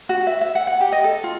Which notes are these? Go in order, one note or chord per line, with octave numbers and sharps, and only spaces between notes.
F#4
E5
E5
F#5
F#5
G4
D#5
A4
F4